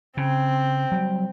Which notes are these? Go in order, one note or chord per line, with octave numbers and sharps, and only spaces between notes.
C#3 C4
F#3 G3